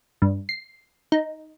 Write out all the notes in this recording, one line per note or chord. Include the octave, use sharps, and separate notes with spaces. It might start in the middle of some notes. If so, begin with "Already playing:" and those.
G2
C7
D#4